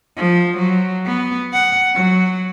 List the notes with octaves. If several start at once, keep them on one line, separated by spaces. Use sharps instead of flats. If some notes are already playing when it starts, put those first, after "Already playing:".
F3
F#3
B3
F#5
F#3